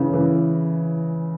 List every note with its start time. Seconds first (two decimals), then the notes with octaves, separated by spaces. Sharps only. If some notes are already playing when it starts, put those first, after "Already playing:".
Already playing: C#3 E3
0.13 E3